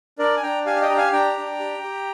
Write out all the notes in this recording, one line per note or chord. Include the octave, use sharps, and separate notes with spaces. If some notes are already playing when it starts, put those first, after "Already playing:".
D4 A#4 D5
G#5
D4 G5 A#5
G4 F5 G#5
F5
D#5 G5
G4 A#5
F5 G#5
D4 G5 A#5
D4
G4
G4